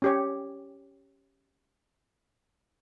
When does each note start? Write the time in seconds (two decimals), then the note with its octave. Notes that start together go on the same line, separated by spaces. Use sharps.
0.02 C#4 G4 C#5